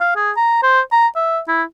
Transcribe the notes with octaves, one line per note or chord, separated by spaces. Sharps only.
F5
G#4
A#5
C5
A#5
E5
E4